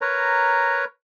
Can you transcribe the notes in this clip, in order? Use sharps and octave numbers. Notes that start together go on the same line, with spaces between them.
A#4 B4 C#5 A#5